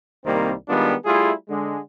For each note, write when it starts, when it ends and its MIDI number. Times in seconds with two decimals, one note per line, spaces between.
0.25 0.52 36
0.25 0.52 51
0.25 0.52 55
0.25 0.52 58
0.25 0.52 60
0.68 0.94 51
0.68 0.94 55
0.68 0.94 56
0.68 0.94 59
0.68 0.94 62
0.68 0.94 65
1.05 1.32 55
1.05 1.32 57
1.05 1.32 64
1.05 1.32 65
1.05 1.32 68
1.49 1.79 50
1.49 1.79 56